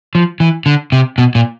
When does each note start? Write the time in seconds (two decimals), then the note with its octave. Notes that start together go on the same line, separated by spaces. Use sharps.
0.15 F3
0.40 E3
0.66 D3
0.92 C3
1.18 B2
1.35 A#2